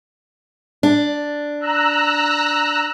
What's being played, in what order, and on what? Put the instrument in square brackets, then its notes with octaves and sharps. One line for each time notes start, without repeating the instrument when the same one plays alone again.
[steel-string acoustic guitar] D4
[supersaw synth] A#5 E6 F#6